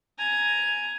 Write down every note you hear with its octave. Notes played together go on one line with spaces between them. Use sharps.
G#5 A#5